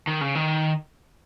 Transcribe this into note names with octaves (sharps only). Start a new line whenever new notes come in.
D#3
C#3
D#3